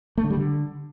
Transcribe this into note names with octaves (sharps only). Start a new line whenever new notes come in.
A3
D3
G3
D3